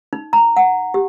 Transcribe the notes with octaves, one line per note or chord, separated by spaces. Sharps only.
D#4
A#5
F#5
G4